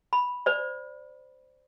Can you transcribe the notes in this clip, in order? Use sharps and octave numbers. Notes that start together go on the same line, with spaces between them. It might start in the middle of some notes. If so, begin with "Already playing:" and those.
B5
C5 D5